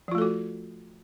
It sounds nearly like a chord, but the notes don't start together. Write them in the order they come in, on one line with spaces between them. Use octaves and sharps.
F3 F4 A3 A4 F#4